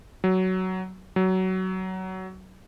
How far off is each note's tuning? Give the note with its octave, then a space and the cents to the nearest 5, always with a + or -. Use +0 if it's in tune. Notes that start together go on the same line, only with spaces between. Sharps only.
F#3 +15
F#3 +20